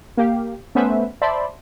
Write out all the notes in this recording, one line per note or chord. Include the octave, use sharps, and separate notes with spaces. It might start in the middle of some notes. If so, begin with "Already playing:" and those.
A#3 G4 F5
A3 B3 C#4 B4 C5 E5
C5 D5 E5 A5 B5 C6